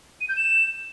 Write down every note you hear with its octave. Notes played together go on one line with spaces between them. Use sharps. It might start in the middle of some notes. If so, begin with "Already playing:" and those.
D#7
G6
E7